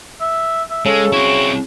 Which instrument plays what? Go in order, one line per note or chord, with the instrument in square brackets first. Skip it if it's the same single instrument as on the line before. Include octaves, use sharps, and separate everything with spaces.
[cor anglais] E5
E5
[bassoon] C#3 [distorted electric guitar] G#3 [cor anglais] A4
[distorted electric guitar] C4 E4 [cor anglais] F#4